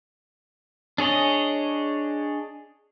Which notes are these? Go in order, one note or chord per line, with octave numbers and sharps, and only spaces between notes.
D4 G#4 C#5 D#5